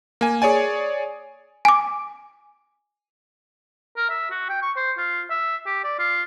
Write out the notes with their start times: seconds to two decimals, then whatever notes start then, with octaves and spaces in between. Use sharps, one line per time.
0.21 A#3 G#5
0.42 G#4 C#5 D5 G#5
1.65 G#5 D6
3.97 A#4
4.10 E5
4.31 F#4
4.49 G5
4.62 C#6
4.77 C5
4.98 F4
5.31 E5
5.66 G4
5.84 D5
5.99 F4